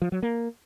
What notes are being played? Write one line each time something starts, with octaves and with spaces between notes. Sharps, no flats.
F3
F#3
A#3